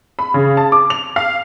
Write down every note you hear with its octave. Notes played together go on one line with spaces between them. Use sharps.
B5
C#3
A5
D6
F7
F5